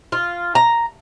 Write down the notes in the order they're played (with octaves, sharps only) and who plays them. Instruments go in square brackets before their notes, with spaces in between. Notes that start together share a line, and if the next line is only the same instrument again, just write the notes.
[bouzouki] F4
A#5